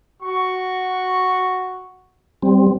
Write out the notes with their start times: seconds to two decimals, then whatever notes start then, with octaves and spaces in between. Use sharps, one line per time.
0.21 F#4 C#6
2.42 G3 C4